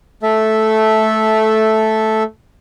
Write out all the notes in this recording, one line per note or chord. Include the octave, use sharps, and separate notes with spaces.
A3 A4 E5